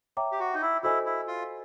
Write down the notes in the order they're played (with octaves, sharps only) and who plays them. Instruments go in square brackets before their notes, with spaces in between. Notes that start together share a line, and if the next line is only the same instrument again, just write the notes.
[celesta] C#5 E5 G5 A#5 D6
[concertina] G4
F#4
D#4
E4
[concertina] E4 [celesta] F#4 A4 C5 D#5 G#5
[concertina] E4
F4